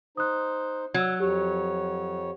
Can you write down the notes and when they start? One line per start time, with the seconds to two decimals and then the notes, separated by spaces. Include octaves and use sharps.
0.17 D#4 C5 D#6 F#6
0.94 F#3 E6 G#6
1.20 F2 G4 C#5